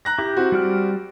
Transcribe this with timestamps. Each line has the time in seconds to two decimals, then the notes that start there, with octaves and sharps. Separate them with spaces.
0.05 A#5 F#6 A#6
0.18 E4 G4
0.37 C4 F#4
0.52 G3 D5 F6